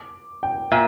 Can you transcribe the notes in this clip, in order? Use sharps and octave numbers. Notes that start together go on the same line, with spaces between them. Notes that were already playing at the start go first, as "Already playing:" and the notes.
Already playing: D6
G5
A#2 E5